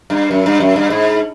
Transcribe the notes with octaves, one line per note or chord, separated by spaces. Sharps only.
G2
F#2
G2
F#2
G2
G#2